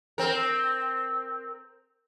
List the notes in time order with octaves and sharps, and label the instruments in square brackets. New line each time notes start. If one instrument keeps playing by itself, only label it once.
[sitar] C4 A#4